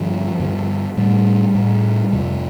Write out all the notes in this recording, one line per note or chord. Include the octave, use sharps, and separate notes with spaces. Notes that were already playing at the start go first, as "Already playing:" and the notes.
Already playing: G2 D3 F3
G2 D3
A2 G3
A2
F2 C3